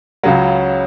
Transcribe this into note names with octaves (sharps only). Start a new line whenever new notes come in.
C#2 C#3 F#3